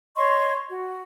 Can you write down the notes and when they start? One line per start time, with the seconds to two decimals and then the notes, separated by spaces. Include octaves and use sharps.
0.16 C#5 D#5 C6 C#6
0.69 F#4